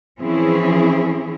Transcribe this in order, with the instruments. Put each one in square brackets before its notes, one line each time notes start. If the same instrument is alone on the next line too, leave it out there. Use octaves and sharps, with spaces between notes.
[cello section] E3 F3 C4 C#4 E4 G#4